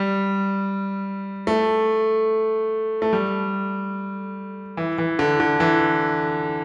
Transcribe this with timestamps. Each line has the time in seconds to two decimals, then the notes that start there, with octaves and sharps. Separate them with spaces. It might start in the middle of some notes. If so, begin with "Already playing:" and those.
Already playing: G3
1.47 A3
3.02 A3
3.13 G3
4.77 E3
4.98 E3
5.19 D3
5.40 D3
5.60 E3